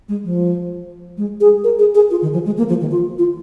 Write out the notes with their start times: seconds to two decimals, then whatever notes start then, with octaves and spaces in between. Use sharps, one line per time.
0.09 G#3
0.24 F3
1.18 G#3
1.41 G#4
1.64 A#4
1.79 G#4
1.95 G#4
2.11 F4
2.22 D#3
2.33 F3
2.46 G#3
2.58 A#3
2.69 F3
2.81 D#3
2.91 F4
3.19 F4